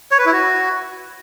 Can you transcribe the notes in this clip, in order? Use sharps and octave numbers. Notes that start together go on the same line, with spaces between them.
C#5
B4
E4
F#4